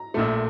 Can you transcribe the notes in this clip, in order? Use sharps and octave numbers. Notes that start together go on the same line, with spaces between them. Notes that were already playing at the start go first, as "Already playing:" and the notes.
Already playing: A#5
A#1 A#2 A3